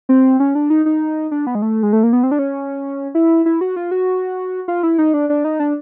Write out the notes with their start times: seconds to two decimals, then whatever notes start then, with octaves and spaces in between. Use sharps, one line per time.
0.09 C4
0.40 C#4
0.55 D4
0.70 D#4
0.86 D#4
1.31 D4
1.47 B3
1.55 G#3
1.62 A3
1.83 G#3
1.93 A3
2.03 A#3
2.13 B3
2.23 C4
2.31 D4
2.39 C#4
3.15 E4
3.46 E4
3.61 F#4
3.76 F4
3.91 F#4
4.68 F4
4.83 E4
4.98 D#4
5.14 D4
5.29 D4
5.44 D#4
5.60 D4